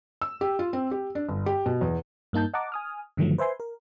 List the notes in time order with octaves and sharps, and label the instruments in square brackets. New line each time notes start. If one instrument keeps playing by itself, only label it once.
[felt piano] E6
G4
F4
C4
G4
D4
G1
G4
B2
E2
[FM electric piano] G2 A#3 D#4 A5 G6
D#5 F#5 A5 A#5 D6
G#5 D#6 F6
G2 D3 D#3 F3 F#3 A3
B4 C5 E5 G#5 C6
A#4